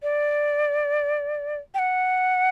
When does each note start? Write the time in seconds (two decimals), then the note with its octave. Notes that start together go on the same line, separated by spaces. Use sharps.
0.03 D5
1.74 G5
1.79 F#5